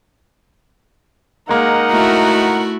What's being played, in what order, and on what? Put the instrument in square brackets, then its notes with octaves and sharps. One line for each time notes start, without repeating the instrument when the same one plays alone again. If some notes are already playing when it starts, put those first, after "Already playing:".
[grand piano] G#3 A#3 [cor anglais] D#4 [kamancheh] A#4 F#5
[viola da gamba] A3 E4 F#4